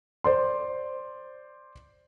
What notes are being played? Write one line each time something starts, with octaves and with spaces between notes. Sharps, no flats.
C5 D5 C6